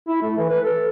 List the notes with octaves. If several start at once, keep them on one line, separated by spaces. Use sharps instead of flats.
E4
A3
E3
B4
A4